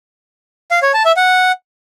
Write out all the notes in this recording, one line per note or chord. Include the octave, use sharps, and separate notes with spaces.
F5
C#5
A5
E5
F#5